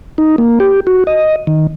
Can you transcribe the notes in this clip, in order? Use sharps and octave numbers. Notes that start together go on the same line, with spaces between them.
D#4
A#3
G4
F#4
D#5
D#3